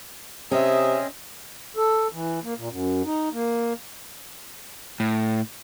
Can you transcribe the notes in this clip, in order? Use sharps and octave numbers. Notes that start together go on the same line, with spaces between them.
C3 C4 C#4 G#4 D#5 E5
A4
E3
A#3
A#2
F#2
D#4
A#3
A2